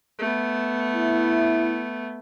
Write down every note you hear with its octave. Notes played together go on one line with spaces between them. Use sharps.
A3 B3
E4